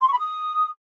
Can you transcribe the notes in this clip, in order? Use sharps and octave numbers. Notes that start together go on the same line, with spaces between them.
C6
C#6
B5
D#6